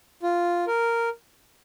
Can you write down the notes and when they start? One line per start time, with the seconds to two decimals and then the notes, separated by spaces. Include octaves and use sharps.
0.23 F4
0.67 A#4